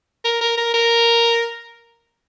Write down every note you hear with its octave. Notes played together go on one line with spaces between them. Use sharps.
A#4
A#4
A#4
A#4